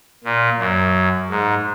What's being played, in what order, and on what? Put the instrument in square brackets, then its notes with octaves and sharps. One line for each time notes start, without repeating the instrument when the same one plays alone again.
[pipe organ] A#2
F#2
G#2